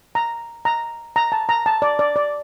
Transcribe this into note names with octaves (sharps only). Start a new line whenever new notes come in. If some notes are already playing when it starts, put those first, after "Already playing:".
A#5
A#5
A#5
A5
A#5
A5
D5
D5
D5